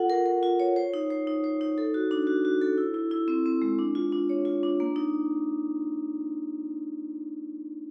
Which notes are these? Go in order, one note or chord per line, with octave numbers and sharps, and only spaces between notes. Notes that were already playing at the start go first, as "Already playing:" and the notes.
Already playing: F4 A4 F#5
A#4
A#4
F4
C#5
C5
D#4
C5
D#4
C5
D#4
A4
F#4
D4
F#4
F#4
A4
E4
E4
E4
C4
C4
G#3
D4
F4
D4
C#5
F4
D4
A#3
D#4